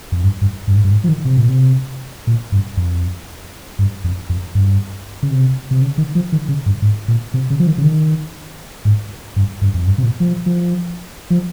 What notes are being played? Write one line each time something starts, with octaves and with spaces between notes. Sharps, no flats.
F2
G2
G2
G2
G#2
G2
G#2
F3
D#3
C3
A#2
C3
A#2
G2
F2
G2
F2
F2
G2
C#3
C3
C3
C#3
D#3
F3
D#3
C#3
G2
G#2
A#2
C3
C#3
F3
D#3
C#3
D#3
G#2
G2
G2
F2
G2
C3
A#2
F3
F3
F3